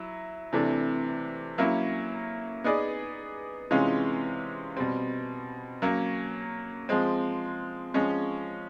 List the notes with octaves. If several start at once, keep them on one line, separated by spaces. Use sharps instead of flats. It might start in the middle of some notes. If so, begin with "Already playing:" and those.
Already playing: F#3 E4
C3 E3 A3 D4
F#3 A#3 C#4 E4
B3 D#4 G#4 B4 D5
C3 E3 G#3 C#4 F4
B2 G3 C4
F#3 A#3 C#4
F3 G#3 C4
F3 G#3 C#4